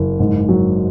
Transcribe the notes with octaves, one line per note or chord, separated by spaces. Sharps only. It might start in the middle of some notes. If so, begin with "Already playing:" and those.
Already playing: F#1
G#2
F#3